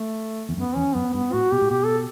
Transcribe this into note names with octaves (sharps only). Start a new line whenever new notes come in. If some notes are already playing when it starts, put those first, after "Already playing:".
Already playing: A3
E2
F#2 B3
E2 C#4
F#2 B3
G2 B3
A2 F#4
B2 G4
A2
B2 G4
A4